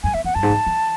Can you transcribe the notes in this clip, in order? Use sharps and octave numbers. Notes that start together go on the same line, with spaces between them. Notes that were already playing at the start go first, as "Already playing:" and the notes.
F#2 G#5
E2 E5
E2 F#5
F#2 A5
G#2
F#2
E3